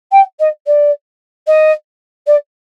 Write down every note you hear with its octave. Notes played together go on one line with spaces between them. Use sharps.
G5
D#5
D5
D#5
D5